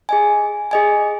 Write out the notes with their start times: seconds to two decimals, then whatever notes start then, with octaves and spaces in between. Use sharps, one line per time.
0.09 G#4 D#5 G#5
0.71 G#4 D#5 G#5